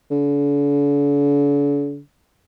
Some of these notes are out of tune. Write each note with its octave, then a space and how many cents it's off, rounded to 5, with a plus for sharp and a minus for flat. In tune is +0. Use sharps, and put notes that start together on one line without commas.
D3 -45